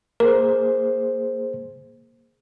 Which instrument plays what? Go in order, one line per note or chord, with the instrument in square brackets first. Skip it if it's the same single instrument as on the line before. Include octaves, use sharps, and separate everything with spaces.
[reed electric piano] A#3 G#4 C5 [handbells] A#4